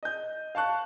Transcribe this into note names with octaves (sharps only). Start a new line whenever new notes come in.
D#5 G6
F5 A5 C#6 F#6